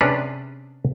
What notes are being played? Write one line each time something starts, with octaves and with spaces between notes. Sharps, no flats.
C3 C#4 D4 G#4 B4